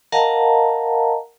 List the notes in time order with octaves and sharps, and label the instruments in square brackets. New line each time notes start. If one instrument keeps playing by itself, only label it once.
[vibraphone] A#4 D#5 F5 F#5 A5 A#5